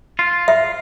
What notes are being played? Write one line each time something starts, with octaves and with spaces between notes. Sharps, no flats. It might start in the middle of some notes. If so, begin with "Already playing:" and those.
F4
E5